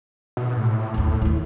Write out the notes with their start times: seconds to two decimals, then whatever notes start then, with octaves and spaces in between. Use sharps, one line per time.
0.37 B2
0.57 A2
0.94 G1 D#2
1.22 D#3 E4